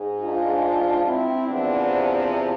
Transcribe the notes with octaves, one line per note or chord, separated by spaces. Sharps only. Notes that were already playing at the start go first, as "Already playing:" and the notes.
Already playing: G#2 G#3
D4 F4
C4 E4
E2 C3 F3 B3 D4